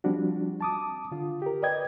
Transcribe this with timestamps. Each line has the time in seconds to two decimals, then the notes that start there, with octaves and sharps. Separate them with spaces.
0.04 F3 G3 C4 D4 F#4
0.61 A5 D6 D#6
1.11 D3 F4
1.42 G4 A#4
1.62 B4 D5 D#5 G5 G#6